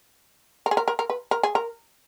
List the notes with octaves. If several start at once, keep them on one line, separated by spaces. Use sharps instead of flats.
A#4
G#4
A#4
A#4
A#4
B4
A#4
G#4
A#4